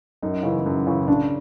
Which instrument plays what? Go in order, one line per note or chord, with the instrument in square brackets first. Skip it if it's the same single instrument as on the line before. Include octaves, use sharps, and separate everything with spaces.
[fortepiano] F#2 [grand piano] D#4
[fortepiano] C#3 E3
F#2
C#3 E3
[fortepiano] C#3 [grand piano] D4